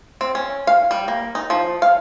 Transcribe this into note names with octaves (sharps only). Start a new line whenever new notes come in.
C4
C#4
F5
G3
A#3
D#4
F3
F5